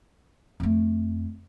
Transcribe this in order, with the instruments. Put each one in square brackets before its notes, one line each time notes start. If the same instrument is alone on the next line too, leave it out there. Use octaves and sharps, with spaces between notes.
[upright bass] F2 A3